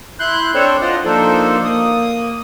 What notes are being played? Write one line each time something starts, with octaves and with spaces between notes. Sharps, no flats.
E4 C6 F#6 G6
C4 D4 A4 C5 C#5
F4 C5 D5 D#5 F#5
F3 A#3 D4 D#4 A4 C5
A#3 D#6